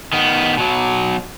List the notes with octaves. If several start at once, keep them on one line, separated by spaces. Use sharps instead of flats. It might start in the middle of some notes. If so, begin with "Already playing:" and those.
D#3 B3
B2 F#3